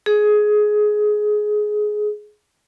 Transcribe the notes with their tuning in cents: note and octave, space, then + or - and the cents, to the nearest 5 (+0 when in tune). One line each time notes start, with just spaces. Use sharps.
G#4 +15